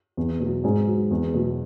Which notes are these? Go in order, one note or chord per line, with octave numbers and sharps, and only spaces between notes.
E2
B2 F#3
G#2 G#4
F#3
E2
B2 F#3